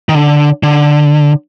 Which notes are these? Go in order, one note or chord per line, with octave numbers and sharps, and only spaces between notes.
D#3
D3
D3